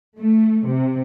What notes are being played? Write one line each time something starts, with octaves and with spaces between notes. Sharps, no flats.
A3
C3